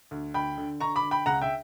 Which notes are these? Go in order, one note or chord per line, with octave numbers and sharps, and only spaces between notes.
D2
D2 G5 B5
D3
D3 A#5 C#6
B5 D6
D3
G5 B5
C#2 F#5 A#5
E5 G5